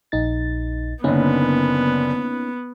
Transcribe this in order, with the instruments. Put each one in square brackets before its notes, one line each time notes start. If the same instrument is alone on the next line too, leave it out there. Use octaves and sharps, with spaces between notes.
[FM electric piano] A#1 D#4 A6
[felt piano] F#1 D3 [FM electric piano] A#3 C#4 D#4 [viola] B3